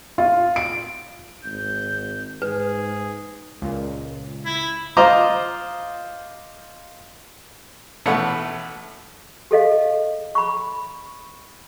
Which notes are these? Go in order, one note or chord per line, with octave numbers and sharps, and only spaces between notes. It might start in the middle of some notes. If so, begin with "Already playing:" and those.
F4
D7
G#1 G6
G#2 G#4 B4
C#2 A#2
E4
F4 C5 D#5 A#5 D6
A1 B2 A3 B3 C#5 F#5
G4 A4 D#5 F5
B5 C#6